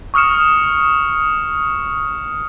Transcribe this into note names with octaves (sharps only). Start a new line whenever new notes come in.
C#6 D#6 F6 C#7 E7